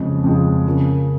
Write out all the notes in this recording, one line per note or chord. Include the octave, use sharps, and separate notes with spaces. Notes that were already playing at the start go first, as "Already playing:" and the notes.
Already playing: F2 C#3 F3 G#3
F2 C#3 F3 G#3
C#3 F3 A#3